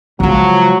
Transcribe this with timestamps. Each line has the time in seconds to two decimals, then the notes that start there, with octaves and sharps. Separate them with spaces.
0.20 C#3 F3 F#3 G#3